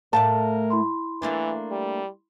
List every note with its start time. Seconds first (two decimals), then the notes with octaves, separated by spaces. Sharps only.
0.13 A2 A3 A#4 D5 F5 A5
0.70 E4 B5 C6
1.22 E3 A3 A#3 D4
1.71 G3